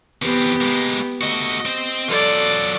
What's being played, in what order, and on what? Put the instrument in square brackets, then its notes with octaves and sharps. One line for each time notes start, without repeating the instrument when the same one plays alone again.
[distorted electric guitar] E2 C4 [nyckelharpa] B3 G4
[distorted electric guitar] G#3 A#3
[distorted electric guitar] A3 F#4 [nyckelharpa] D#5
[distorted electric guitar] C4 C5
[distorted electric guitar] F#3 F4 [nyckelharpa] A4 D5